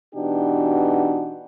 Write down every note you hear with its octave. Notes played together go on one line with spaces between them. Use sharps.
B2 E3 D4 D#4 F#4 G4